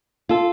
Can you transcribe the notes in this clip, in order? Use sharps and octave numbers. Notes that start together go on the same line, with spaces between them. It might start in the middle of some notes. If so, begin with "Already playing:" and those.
F4 A4